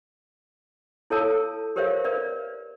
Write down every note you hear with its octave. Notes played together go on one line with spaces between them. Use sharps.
E4 A4 C#5 F5 A5 E6
G4 A#4 C5 C#5 E5 F5
A#4 B4 D5 F5